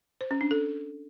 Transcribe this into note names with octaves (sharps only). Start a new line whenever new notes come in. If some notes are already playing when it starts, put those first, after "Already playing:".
C5
C#4
D4
A4